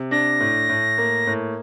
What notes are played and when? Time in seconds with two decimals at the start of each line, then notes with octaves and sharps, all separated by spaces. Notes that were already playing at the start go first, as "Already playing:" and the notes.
Already playing: C3
0.11 D4 A#6
0.40 A2
0.69 A2
0.98 A#3
1.27 A2